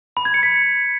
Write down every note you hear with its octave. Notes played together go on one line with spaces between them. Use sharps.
B5
G#6
C#7
B6